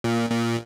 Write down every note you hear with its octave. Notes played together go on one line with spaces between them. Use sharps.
A#2
A#2